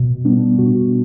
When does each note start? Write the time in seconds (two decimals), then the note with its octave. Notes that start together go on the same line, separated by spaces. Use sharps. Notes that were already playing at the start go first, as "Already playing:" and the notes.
Already playing: B2
0.25 G3 B3 D4
0.58 B2 F#4